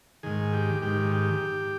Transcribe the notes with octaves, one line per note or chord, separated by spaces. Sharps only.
G#2 D#3 G#4
G4
G#2 D#3 G4
G4